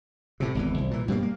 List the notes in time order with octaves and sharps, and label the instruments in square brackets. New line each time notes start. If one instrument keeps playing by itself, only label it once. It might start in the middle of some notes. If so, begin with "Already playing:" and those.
[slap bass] A2 C3
G#1 E2 E3
C2
A#2 E3
G2 B2 G#3 A#3
A#3